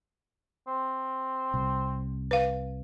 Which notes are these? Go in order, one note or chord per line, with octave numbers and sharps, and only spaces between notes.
C4
C2
B4 F5